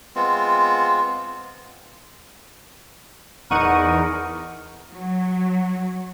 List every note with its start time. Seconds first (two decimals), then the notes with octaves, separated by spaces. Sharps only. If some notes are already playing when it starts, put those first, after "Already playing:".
0.16 G#3 B3 C4 F4
3.51 D#1 E2 D#4 A#4 F#5 C#6 D#7
4.92 F#3